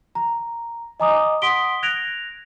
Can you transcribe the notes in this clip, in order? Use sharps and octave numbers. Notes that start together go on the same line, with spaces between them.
A#5
D#5 G#5 A#5 D6 D#6
F#5 C6 D#6 B6 D7 G7
F#6 G#6 A#6 D7 F7